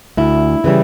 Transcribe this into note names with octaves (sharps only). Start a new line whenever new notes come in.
D2 E4
C#3 E3 G3